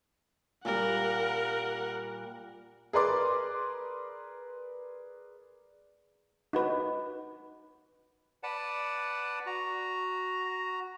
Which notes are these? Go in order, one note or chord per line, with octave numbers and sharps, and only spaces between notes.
A#2 G3 A#4 F#5
G#4 A#4 B4 D5 C6 D6
D#4 F#4 B4
B4 D5 F#5 A5
F#4 A#5